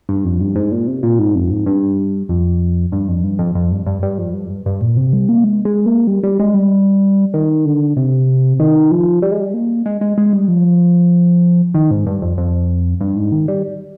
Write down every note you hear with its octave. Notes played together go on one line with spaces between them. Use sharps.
G2
F2
G2
G#2
A#2
C3
A#2
G#2
F2
G#2
G2
F2
G2
F2
G2
F2
F2
G2
G2
G2
F2
G2
F2
G2
G2
A#2
C3
G3
A#3
G#3
G#3
A#3
G3
G3
G#3
G3
D#3
D3
C3
D#3
F3
G3
G#3
G3
A#3
G#3
G#3
G#3
G3
F3
D#3
G#2
G2
F2
F2
G2
G#2
D#3
G3